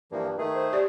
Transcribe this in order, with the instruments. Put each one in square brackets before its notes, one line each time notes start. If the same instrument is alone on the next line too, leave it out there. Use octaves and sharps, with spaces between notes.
[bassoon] G2 [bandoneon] E3 F3 A#3
[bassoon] D#3 [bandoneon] A3 G#4
[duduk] C5
[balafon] G4 D5